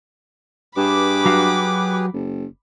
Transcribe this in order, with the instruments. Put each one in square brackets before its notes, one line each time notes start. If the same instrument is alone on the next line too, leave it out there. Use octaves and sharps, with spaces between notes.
[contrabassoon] G2 [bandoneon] G4 G#4 B4 [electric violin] B5 D6
[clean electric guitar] F#3 F#4 F5
[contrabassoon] F#1